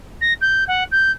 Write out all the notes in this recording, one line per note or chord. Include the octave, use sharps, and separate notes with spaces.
A#6
G6
F#5
G6